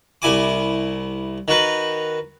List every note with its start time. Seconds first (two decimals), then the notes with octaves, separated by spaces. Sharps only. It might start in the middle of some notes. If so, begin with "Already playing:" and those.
0.22 C2 E4 G#5 D6
1.48 D#3 F#4 B4